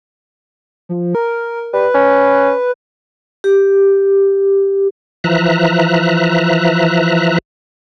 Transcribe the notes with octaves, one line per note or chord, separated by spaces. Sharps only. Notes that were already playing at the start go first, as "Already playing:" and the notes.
F3
A#4
G3 B4
C#4
G4
E3 F3 E5 A#5 F#6